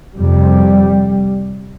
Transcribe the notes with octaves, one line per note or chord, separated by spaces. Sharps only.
F2 C3 G3